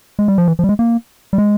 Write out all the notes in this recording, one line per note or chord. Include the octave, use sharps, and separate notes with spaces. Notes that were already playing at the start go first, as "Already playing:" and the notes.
G#3
G3
F3
E3
F3
G3
G#3
A#3
G3
G#3